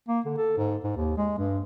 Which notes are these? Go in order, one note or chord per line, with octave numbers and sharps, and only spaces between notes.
A#3
D3
A4
G#2
G#2
D#2
G#3
G2